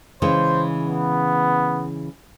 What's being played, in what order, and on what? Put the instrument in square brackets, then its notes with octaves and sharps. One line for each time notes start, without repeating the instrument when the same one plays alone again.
[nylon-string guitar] C#3 E3 G#3 [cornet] C5
[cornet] B3